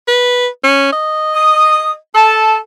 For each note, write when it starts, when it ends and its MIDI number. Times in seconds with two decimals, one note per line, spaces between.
0.08 0.47 71
0.64 0.91 61
0.92 1.96 75
1.35 1.91 87
2.15 2.58 69
2.15 2.56 81